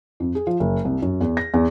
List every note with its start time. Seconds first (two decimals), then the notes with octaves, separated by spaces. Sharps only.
0.20 F2
0.35 G#4
0.47 F3
0.60 F#1
0.85 C2
1.02 F#2
1.21 E2
1.37 A#6
1.54 E2